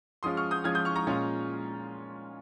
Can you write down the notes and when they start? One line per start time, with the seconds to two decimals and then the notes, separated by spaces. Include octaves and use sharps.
0.23 F3 G#3 C#4 F4 C6 D#6
0.37 C#6 F6
0.51 D#6 G6
0.64 F3 G#3 C#4 F4 F6 G#6
0.75 D#6 G6
0.85 C#6 F6
0.96 A#5 C#6
1.06 A#2 G#3 C#4 F4